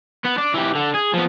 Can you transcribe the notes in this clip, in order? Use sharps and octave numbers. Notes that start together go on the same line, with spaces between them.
B3
D4
E3 G4
D3
G#4
F3 B3